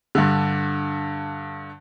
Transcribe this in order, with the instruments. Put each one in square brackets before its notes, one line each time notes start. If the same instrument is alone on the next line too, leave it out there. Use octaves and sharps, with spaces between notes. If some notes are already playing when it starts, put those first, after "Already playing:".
[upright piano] G2 D3